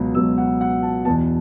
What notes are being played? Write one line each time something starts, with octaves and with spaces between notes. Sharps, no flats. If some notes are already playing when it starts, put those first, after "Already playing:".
Already playing: C#2 B2 F#3 B3
C#2 B2 F#3 B3 E6
F#5
F#5
A5
E2 B2 B3 A5